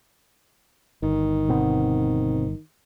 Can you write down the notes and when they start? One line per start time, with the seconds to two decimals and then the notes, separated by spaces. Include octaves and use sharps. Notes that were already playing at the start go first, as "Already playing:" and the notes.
1.03 G1 D#3
1.48 B2 B3 C4